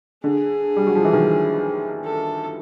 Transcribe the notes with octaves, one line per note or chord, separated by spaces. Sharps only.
D3 G#4
G3
F#3
F3
E3
D#3
A4